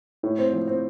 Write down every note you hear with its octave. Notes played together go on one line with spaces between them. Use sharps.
A2
C4
F3
C4